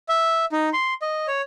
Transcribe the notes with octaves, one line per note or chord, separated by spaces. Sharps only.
E5
D#4
C6
D#5
C#5